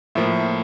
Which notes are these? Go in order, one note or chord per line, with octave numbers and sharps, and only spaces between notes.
A2 F3 A#3 E5